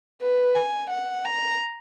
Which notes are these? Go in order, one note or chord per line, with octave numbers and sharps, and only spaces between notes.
B4
G#5
F#5
A#5